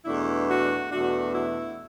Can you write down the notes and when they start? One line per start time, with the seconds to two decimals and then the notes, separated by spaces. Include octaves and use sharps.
0.05 E2 B2 A3 D4 E4
0.49 F#4
0.91 E2 B2 A3 D4 F#4
1.35 E4